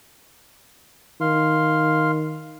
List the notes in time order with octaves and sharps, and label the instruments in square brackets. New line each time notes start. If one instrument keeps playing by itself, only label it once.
[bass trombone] D#3 [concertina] F5 C6